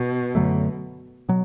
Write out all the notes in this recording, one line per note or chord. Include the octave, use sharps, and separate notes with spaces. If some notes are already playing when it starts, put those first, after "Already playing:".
Already playing: B2
F#2 D3 F#3 A3
B2 F#3